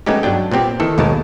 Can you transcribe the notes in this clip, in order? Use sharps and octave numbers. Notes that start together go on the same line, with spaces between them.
G#3 A3 B3 C#4 D#4 G4
G2 F#3 D4 G5
A#2 B3 C4 G4
D#3 E3 A4
D#2 B2 G#3 A3 A#4 A5